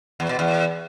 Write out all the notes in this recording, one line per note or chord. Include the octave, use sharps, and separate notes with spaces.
E2
B2
E2